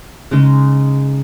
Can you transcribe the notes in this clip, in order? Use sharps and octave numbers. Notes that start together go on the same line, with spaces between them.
C#3 G#3 D#4